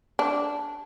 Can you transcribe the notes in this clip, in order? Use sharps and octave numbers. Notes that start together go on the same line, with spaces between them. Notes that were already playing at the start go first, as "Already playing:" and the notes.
D4